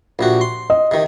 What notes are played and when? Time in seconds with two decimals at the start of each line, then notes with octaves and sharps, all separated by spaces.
0.19 A#1 C3 F#4
0.41 C6
0.70 D#5
0.91 C3 D#3